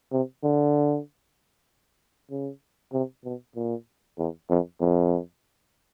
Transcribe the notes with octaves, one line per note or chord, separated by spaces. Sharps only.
C3
D3
C#3
C3
B2
A#2
E2
F2
F2